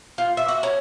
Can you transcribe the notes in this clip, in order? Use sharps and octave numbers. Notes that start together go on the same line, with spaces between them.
F4
E5
F#4
C#4